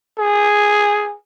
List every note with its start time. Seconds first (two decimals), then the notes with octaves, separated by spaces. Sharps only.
0.18 G#4